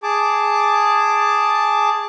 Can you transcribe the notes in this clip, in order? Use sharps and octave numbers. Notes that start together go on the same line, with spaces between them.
G#4 A5 D6